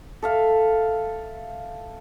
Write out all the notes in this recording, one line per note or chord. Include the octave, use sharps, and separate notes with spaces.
A4 E5 F5